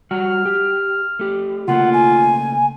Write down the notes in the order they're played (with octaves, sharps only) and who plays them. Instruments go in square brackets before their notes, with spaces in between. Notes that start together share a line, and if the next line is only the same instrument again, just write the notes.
[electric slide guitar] G3 F#4 F#5 [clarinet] F6
[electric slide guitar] G4
A3 G4
[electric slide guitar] C#3 A3 A#3 [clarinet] F4 [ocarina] F#5
[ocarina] G#5